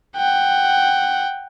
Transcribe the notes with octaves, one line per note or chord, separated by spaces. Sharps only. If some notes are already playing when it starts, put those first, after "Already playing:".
F#5 G5